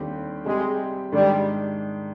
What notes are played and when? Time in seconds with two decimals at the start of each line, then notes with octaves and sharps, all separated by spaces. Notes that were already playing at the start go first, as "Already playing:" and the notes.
Already playing: D#2 D3 G3 C4 G4
0.46 C3 G3 G#3 C4 G4
1.12 G#2 D#3 G3 G#3 D4